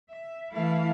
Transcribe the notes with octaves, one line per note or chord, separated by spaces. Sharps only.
E5
E3 A3 E4 F5